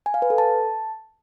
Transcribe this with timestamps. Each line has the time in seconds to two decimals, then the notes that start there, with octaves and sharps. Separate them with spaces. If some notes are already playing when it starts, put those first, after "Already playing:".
0.06 G#5
0.14 F5
0.22 B4
0.30 A4
0.38 A5